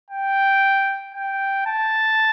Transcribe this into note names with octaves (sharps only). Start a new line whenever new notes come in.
G5
G5
A5